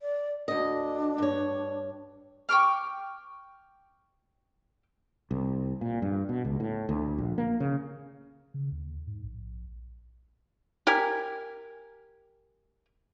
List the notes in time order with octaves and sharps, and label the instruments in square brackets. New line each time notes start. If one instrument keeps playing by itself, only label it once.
[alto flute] D5
[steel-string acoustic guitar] D2 D#5 [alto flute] D4
[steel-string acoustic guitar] G2 C#5
[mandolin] G5 C#6 D6 F6
[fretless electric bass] C2
A#2
G2
B2
C#2
A2
D2
A#1
A#3
C#3
[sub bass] C#3
D#2
G#2
A#1
[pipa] G4 A#4 G#5